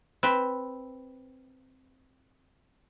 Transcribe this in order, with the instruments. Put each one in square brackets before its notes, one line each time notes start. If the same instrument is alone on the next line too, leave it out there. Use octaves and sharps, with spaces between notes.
[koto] C4 B4